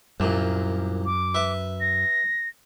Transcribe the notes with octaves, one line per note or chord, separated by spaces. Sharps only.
C2 F#2 A#2
D6
B4 E5
A#6